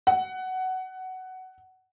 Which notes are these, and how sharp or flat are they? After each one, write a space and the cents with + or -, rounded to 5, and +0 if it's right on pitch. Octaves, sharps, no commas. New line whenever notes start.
F#5 +15